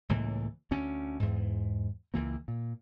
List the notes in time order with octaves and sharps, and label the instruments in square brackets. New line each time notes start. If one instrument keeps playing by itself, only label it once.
[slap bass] C#2 A2 E3 A#3
D2 C#4
E2 G#2
C#2 E3 A#3
A#2